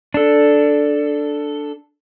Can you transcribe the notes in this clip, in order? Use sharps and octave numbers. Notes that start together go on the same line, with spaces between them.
D4 A4